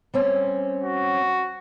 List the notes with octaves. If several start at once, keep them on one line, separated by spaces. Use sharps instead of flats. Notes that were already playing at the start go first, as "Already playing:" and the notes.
G3 C4 C#4
F#4